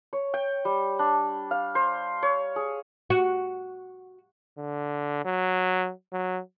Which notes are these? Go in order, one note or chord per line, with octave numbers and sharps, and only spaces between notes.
C#5
G5
G3
D4
F5
C5
C#5
G#4
F#4
D3
F#3
F#3